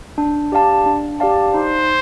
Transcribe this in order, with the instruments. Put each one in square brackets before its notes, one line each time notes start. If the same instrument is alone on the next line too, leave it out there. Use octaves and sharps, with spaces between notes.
[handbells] D4
G4 D5 F5 A5
D4
G4 D5 F5 A5
[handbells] D#4 [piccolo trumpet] C5